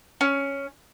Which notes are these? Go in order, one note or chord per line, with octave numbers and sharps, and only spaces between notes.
C#4